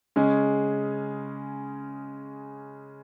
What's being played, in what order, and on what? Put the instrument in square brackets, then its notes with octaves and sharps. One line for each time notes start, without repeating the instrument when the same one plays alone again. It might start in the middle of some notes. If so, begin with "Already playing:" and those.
[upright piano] C#3 G#3 C#4 G#4